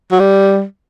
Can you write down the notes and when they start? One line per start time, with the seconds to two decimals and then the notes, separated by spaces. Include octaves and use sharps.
0.11 F#3
0.20 G3